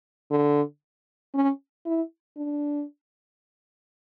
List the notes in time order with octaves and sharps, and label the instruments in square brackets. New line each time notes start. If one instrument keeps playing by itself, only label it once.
[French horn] D3
C#4
E4
D4